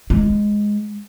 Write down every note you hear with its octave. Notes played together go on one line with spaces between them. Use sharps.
G#3